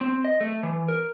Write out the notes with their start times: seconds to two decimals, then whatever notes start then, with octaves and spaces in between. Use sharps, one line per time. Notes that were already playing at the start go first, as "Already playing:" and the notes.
0.01 C4
0.25 D#5
0.41 A3
0.63 E3
0.88 A#4